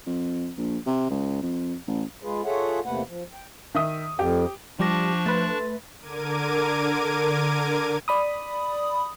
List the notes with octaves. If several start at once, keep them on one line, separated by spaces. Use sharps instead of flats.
F2
A#1
C3
C#2
F2
A1
G#3 F4 G#4 B4
F4 G#4 A4 C#5 E5 F#5
E2 C3 A3 A#3 B4 F#5
F3
G5
D#3 E5 D#6
F2 G4
F3 G3 D4 G5 A5 C#6 D6 A#6
A3 B4 C6 F#6 A6
D3 A#4 D6 G#6 D#7
D5 B5 D#6